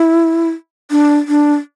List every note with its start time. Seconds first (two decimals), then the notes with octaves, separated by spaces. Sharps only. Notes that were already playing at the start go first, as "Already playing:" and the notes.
Already playing: E4
0.91 D4
1.28 D4